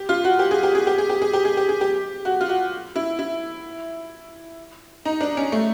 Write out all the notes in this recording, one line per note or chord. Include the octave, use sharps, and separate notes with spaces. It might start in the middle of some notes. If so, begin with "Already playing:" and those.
Already playing: G4
F4
F#4
G4
G#4
G4
G#4
G4
G#4
G4
G#4
G4
G#4
G4
G#4
G4
F#4
F4
F#4
E4
E4
D#4
D4
C#4
A3